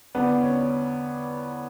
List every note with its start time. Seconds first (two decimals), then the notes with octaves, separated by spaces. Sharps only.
0.15 E2 D3 G3 B3 D4
0.42 C#4